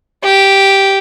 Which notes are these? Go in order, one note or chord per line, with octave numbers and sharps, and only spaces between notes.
G4